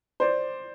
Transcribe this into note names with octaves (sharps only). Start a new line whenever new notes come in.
C5 D5